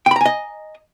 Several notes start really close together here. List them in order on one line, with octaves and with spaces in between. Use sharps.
G5 B5 A#5 G#5 D#5